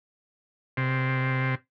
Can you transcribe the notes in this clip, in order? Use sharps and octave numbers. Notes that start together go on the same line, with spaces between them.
C3